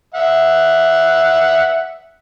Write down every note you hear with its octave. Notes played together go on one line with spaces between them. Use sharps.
E5 F#5